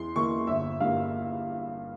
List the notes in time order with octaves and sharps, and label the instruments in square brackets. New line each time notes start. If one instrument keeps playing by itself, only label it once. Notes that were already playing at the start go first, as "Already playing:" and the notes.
Already playing: [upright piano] E2 C6
E3 A#3 C#6
G1 E5
G2 G3 A#3 F5